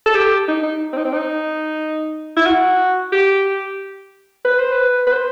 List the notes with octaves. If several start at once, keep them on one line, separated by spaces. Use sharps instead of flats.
A4
G4
D#4
D#4
C4
D#4
C4
D#4
E4
F#4
G4
B4
C5
B4
B4
C5